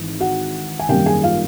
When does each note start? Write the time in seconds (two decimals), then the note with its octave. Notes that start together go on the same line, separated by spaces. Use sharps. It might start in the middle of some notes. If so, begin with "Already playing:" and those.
Already playing: G#1 G#2 E3
0.20 F#4 F#5
0.80 G#5
0.89 G#1 F#2 D#3 G3 A#3 G4 G5
1.06 G#4 G#5
1.24 F4 F5